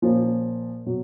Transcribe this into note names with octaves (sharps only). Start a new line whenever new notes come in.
A#2 F3 A#3 C#4
B2 F#3